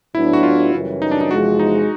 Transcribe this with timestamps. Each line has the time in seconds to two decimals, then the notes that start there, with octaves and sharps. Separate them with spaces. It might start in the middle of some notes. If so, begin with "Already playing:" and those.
0.15 A2 F#3 B3 D4 E4
0.33 F#4
0.43 F4
0.73 F#2 C#3 E3 G3
1.02 D#4
1.11 D4
1.21 D#4
1.31 E2 C3 F3 G#3 F#4
1.59 D#4